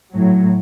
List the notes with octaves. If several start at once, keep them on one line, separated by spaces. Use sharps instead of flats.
A2 F#3